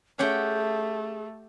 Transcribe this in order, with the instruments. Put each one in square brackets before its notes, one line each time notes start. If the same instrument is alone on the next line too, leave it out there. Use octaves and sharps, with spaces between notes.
[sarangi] A3 [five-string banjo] C#4 [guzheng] G4 F#5 G5 [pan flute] G#4